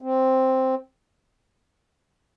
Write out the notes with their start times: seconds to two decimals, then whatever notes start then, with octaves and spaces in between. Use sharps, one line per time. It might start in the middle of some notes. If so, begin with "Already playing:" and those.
0.02 C4